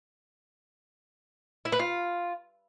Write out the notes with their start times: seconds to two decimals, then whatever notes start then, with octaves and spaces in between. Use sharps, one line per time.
1.65 E4
1.72 B4
1.79 F4